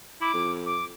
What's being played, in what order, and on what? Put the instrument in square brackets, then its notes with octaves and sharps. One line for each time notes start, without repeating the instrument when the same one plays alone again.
[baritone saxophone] E4 [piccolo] D6
[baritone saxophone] F2
[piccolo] D6